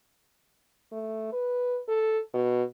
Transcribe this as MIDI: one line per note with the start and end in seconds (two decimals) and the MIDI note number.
0.92 1.32 57
1.33 1.80 71
1.88 2.20 69
2.34 2.63 47